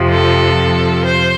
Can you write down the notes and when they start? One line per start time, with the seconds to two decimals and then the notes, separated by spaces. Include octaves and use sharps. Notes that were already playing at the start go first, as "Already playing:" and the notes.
Already playing: F2 C3 F3
0.08 A4
1.05 C5